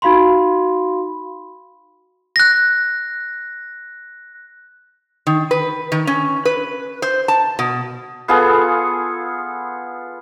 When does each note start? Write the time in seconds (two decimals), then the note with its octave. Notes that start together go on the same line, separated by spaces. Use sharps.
0.02 D#4 F#4 F5 B5 C6
2.36 F#6 A#6
5.27 D#3
5.51 B4
5.92 D#3
6.07 C#4
6.45 B4
7.02 C5
7.28 A5
7.59 B2
8.28 B3 F4 G#4 A4